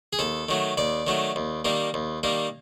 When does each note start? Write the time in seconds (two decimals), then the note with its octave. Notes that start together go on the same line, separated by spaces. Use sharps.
0.13 G#4
0.19 D#2 A4
0.49 D#3 F#3 A3
0.77 D#2 D5
1.07 D#3 F#3 A3
1.36 D#2
1.65 D#3 G3 A#3
1.94 D#2
2.23 D#3 G3 A#3